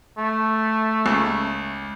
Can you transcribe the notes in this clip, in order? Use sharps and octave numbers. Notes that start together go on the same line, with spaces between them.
A3
C#2